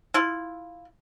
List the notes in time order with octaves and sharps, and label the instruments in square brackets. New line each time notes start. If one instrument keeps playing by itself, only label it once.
[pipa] E4 F4